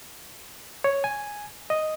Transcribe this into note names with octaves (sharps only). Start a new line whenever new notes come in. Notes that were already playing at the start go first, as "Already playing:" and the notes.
C#5
G#5
D#5